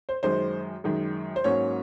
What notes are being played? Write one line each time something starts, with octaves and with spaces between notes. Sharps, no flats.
C5
F#2 D#3 G#3 C5
F#2 D#3 G#3
C5
G#2 F#3 A#3 C#4 C#5